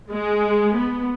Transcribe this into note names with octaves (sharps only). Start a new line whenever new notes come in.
G#3
B3